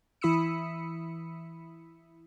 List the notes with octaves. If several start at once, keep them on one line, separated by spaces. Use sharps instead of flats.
E3 E4 B5 D#6 E6 C#7